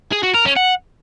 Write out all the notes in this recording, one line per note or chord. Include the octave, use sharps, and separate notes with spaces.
G#4
F#4
A#4
C#4
F#5